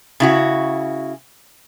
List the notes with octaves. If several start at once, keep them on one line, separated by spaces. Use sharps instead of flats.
C#3 E4 F#4